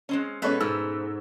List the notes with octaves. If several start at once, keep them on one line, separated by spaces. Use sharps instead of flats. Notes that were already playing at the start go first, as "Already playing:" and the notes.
G#3 C4 C#4
B2 G#3 A3 B3 C#4 B4 C#5 E5
G#2 E6